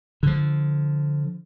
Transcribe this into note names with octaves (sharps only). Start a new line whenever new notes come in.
D3 F3